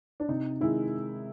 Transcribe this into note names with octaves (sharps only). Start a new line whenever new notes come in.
D4
C3 D#4
D#3 G#3 E4